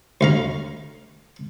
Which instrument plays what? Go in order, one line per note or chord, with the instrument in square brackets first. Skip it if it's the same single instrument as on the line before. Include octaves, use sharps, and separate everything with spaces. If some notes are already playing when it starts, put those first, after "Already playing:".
[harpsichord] D2 F5 A#5